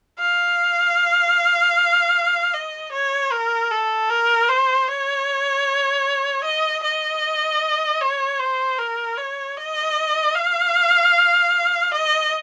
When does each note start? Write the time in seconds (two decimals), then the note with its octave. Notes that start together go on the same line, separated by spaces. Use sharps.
0.19 F5
2.54 D#5
2.92 C#5
3.31 A#4
3.71 A4
4.10 A#4
4.49 C5
4.88 C#5
6.45 D#5
6.83 D#5
8.01 C#5
8.39 C5
8.79 A#4
9.17 C#5
9.57 D#5
10.35 F5
11.91 D#5